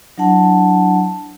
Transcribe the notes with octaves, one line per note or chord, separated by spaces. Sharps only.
F#3 D4 E4 F#5 A5